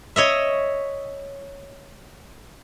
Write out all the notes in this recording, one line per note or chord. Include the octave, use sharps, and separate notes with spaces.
C#5 D#5 E5